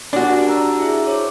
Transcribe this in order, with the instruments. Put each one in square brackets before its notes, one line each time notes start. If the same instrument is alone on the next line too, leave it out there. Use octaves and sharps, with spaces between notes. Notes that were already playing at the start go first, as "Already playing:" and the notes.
[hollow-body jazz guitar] D4 F#4 [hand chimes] G4 A#4 G#5
[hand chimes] G4
A5 A#5 E6
E4 G#4 E5
C5 C#5 D6